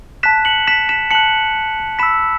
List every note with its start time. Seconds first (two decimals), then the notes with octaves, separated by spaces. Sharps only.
0.23 A5 F#6 B6 E7
0.45 C#7 F#7
0.68 B6 E7
0.89 B6 E7
1.11 A5 F#6 C#7 F#7
1.99 B5 E6 B6 E7